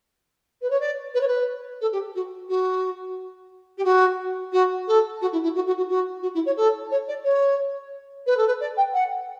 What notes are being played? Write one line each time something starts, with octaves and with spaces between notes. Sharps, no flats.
B4
C#5
D5
B4
C#5
B4
A4
G4
F#4
F#4
G4
F#4
F#4
A4
F#4
E4
E4
F#4
F#4
F#4
F#4
F#4
E4
C#5
A4
C#5
D5
C#5
B4
A4
B4
D5
G5
F#5